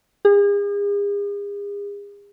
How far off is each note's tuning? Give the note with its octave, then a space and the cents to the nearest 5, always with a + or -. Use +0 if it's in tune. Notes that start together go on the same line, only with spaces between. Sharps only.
G#4 -40